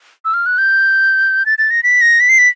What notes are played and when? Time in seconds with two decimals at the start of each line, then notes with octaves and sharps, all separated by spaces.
0.25 E6
0.34 F6
0.46 F#6
0.58 G6
1.46 A6
1.58 A6
1.71 A#6
1.83 B6
2.01 A#6
2.20 B6
2.29 C7
2.38 B6